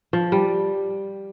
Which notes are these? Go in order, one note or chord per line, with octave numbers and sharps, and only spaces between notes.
F3
G3